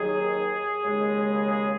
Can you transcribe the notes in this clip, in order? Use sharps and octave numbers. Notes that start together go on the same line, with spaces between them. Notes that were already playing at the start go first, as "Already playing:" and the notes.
Already playing: D#2 D#3 F#3 G#4
D#2 C#3 G#3
G#4